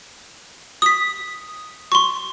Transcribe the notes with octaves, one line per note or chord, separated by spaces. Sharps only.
D#6 B6
C6 C#6